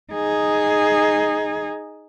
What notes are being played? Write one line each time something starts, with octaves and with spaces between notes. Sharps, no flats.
D#4 G#4